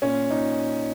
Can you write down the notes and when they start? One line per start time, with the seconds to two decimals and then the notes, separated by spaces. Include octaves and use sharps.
0.02 A#2 C#4
0.30 A#2 D#4